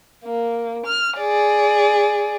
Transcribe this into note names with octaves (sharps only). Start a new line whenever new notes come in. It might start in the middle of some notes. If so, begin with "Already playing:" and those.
A#3
F6
G#4 D5